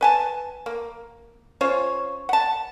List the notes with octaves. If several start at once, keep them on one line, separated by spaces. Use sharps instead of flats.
B4 G#5 A5
A#3
C#4 F4 C5 C#5
F#5 A5